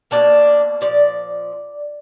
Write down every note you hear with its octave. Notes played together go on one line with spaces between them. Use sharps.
B2 F#3 A#3 D4 D5
A#2 F3 D5